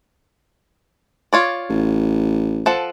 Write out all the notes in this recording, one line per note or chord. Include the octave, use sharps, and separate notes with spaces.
F4 C#5 D5
A1
F3 A4 F#5